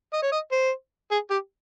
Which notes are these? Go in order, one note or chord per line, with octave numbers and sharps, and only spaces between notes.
D#5
C#5
D#5
C5
G#4
G4